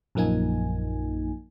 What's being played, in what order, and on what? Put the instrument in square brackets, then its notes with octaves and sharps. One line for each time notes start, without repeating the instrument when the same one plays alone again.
[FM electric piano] A#1 F#2 F3 A#3 D#4 G#5